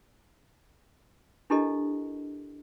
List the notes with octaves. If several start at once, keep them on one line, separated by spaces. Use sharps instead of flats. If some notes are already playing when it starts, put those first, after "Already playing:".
D4 E4 G4 A4 A#4 D#5